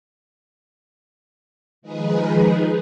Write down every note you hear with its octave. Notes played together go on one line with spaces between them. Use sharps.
D#3 F3 G#3 D#4 G#4 B4